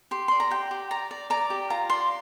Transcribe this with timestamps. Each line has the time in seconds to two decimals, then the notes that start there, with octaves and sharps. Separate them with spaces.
0.11 G4 C6
0.28 D5 C6
0.40 A#5
0.51 G4 G5
0.71 G4
0.91 D5 A#5
1.11 D5
1.30 D5 A#5
1.50 G4
1.70 F4 A#5
1.90 D5 C6